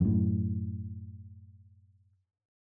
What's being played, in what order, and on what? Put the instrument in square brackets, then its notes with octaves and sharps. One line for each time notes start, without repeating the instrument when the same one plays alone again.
[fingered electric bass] F#2 A2